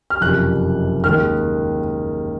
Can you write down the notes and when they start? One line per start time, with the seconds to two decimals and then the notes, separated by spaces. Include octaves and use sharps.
0.10 F6
0.21 F#1 F2 C3 F#6
1.04 D#2 D#3 G#3 F6